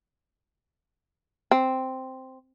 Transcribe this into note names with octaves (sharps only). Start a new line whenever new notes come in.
C4